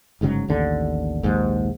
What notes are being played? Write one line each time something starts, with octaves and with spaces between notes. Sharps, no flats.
G1 G#2 C#3 F#3
A1 D#2 D3
A#1 D#2 G#2